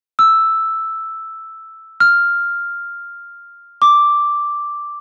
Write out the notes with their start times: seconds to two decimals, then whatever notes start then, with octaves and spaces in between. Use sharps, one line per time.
0.19 E6
2.00 F6
3.82 D6